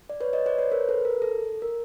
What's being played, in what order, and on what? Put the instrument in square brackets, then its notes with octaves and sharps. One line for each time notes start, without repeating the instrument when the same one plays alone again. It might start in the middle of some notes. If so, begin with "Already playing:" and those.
[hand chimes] D5
B4 C#5
C#5 D#5
C5 D5
B4 C#5
A#4 C5
A4 B4
A#4
A4
A#4